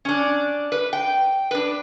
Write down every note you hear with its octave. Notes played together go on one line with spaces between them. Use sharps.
C#4 D4
B4
G5
D4 B4